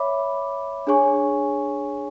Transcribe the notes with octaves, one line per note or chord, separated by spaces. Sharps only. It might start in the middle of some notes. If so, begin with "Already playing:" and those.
Already playing: C#5 E5 B5 D6
D4 G#4 C#5 G#5 C#6